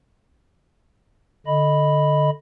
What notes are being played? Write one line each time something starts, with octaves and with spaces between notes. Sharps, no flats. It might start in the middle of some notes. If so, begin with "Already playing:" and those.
D3 D#5 B5